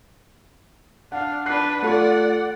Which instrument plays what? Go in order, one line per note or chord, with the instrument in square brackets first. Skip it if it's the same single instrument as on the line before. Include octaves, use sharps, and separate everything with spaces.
[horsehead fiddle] D4 F5 [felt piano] F#5
[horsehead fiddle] D4 B4 [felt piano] F#6 C7
[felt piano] A3 F4 A4 [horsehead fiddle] D5 F#5